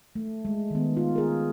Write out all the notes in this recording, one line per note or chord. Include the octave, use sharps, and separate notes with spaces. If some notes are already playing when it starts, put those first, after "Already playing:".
A3
G#3
D#3 B3
F4
G#4 A#4